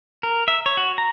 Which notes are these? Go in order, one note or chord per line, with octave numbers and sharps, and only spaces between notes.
A#4
E5
C#5
F#4
A#5